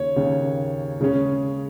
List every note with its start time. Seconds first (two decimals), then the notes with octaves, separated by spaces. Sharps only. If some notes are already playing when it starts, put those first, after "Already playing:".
Already playing: D#2 C#3 A#3 C#4 C#5
0.16 D#2 C#3 A#3 C#4
1.01 C#3 G#3 C#4